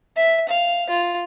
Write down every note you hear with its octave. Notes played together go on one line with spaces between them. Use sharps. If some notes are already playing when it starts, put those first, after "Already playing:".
E5
F5
F4